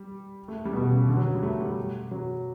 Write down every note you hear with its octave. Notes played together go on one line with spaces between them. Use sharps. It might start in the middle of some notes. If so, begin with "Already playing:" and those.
Already playing: G3
A3
G3
B2
C#3
D3
F#3
G3
A3
G3
F#3